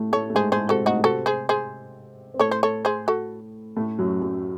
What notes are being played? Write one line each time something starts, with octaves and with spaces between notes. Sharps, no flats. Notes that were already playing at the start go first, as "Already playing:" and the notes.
Already playing: A2 A3
A2 A3 A4 C#5
A3
G#2 G#3 G#4 C5
A2 A3 G#4 C5
C3 C4 F#4 A4
A2 A3 D#4 F#4
A3
C3 C4 F#4 A4
G#4 C5
G#4 C5
C4
A2 A3 A4 C#5
C5
A4 C#5
G#4 C5
F#4 A4
A2 A3
F#2 F#3
F#2 F#3